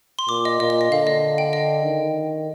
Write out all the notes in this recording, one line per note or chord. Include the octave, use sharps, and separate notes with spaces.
C6
A#2 D6
D#5
A#2 D#5
D#5
D#5
D3 F5
D#5
G5
D#5
D#3